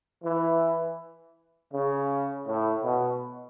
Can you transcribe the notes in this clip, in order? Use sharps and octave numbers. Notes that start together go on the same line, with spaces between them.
E3
C#3
A2
B2